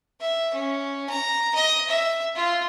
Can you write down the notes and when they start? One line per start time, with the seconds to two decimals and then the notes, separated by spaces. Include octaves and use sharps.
0.20 E5
0.54 C#4
1.09 A#5
1.55 D#5
1.88 E5
2.36 F4